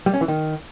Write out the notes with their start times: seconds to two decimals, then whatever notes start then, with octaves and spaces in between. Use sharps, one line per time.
0.06 G3
0.14 C#4
0.21 E3
0.28 D#3